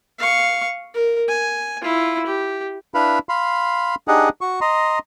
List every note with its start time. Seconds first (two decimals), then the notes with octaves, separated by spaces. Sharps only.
0.19 F5 C#6
0.94 A#4
1.29 G#5
1.82 E4 F4
2.26 G4
2.94 D4 E4 B4 F5 B5
3.29 F5 B5 C6
4.08 D4 D#4 G4 G#4 D#5 F#5
4.41 F#4 C#6
4.61 D#5 A#5 C6